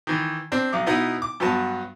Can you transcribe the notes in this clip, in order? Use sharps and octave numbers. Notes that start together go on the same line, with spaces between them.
D#3 E3
C4 D4
B1 D6
B2 B3 D#4 E4
D6
G2 F#3 B3 A5